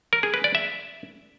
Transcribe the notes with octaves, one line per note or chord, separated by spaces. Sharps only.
A#4
G#4
B4
D5
E5